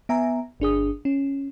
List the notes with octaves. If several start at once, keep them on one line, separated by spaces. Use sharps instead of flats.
B3 E5 G#5 A#5
G1 D4 G#4 D#6
C#4